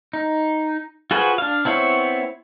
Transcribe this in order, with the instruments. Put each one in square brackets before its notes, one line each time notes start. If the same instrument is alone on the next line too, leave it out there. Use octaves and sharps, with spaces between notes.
[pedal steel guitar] D#4
F4 F#4 G#4 B4 C5
D4 F5
B3 C4 E4 C5 C#5